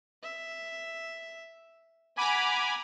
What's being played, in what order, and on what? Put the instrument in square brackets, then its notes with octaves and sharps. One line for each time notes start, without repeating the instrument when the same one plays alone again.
[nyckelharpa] E5
[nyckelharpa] F#5 A#5 [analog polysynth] G#5 B5 D6